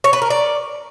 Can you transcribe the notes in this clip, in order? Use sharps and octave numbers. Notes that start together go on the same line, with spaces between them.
C#5
B4
A#4
D5